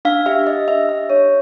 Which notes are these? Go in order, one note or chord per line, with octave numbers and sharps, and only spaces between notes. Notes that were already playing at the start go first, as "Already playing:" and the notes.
D4 F5
G4 E5
G4 D#5
D4 E5
G4 E5
D4 C#5